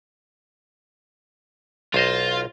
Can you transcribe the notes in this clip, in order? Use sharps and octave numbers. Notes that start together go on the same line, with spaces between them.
B1 F4 C5 D#5